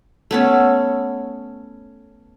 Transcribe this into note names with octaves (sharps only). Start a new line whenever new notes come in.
A3 B3 C#4